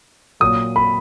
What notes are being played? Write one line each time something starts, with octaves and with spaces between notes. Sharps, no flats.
A#2 F#3 D#6
B5